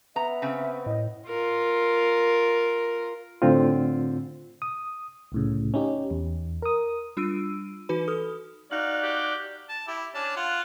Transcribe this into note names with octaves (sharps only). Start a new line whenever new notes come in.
B3 E5 A#5
C#3 C4
A2 D#5
F4 A#4
A2 D3 C4 F4
D#6
C2 A2 C#3
C#4 D#4 G4
E2
A#4 D#6
G3 D4 F4 E6 D7 D#7
E3 D#4 F#4 B4 B5
A4 D#6 F6
D#4 F#4 D5 F5 F#6
G4
A5
E4 G4
C#4 D4 A5
F4 F#5